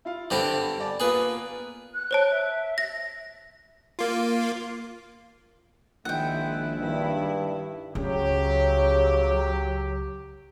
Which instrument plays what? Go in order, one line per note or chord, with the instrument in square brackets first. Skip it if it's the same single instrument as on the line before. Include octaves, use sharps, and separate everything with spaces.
[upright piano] E4 F4 F5
[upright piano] G2 B3 [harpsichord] D3 C4 G4
[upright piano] D5 G#5 A5
[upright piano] A#3 B3 F4 [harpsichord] G#4 B4
[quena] F#6
[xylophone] C5 C#5 A5
[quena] E5
[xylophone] A#6
[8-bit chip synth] A#3 F4
[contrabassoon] A#1 [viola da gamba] D#3 G#3 E4 [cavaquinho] F#5 G5
[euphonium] G2 [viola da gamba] D#3 E4
[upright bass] C#2 [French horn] C#3 [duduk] F#3 [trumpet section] G4